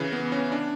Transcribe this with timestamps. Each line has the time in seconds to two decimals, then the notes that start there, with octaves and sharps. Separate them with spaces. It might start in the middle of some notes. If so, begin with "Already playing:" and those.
Already playing: C#3 E3
0.12 B3
0.32 C#4
0.52 D4